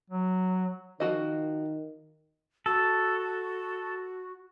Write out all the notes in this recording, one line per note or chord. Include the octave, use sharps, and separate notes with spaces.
F#3
D#3 F3 F#4 D#5
F#4 A4